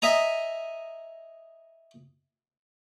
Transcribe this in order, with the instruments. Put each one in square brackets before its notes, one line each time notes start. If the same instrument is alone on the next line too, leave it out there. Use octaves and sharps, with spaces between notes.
[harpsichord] D#5 E5 G#5 A#5